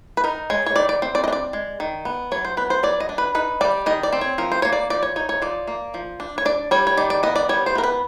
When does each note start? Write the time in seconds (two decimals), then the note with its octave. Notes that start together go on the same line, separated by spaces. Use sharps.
0.17 B4
0.24 D#4 A#4
0.50 G#3 C#5
0.66 C#5
0.76 D#3 D5
0.89 D5
1.02 C4
1.15 D5
1.24 D#5
1.28 D4
1.33 D5
1.53 G#3
1.80 D#3
2.05 B3
2.32 F#3 C#5
2.45 C5
2.57 B3 B4
2.70 C5
2.83 F#3 D5
3.00 D#5
3.09 D4
3.18 B4
3.35 D#4 B4
3.61 G3 D5
3.86 D#3 D#5
4.03 D5
4.13 C4
4.21 C#5
4.38 F3 A#4
4.52 C5
4.62 A#3 C#5
4.73 D5
4.90 F3 D5
5.03 C#5
5.16 D#4 C#5
5.29 C#5
5.42 F3 D5
5.67 A#3
5.94 F3
6.20 D4
6.38 C#5
6.45 D4 D5
6.71 G3 C#5
6.87 C#5
6.97 D#3 D5
7.10 D5
7.23 B3 D#5
7.36 D5
7.49 G3 C#5
7.66 C5
7.75 B3 A#4
7.84 B4